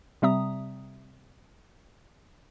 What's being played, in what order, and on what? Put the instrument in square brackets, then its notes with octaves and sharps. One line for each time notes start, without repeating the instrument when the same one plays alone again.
[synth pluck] C3 G3 C4 E5 A#5 D#6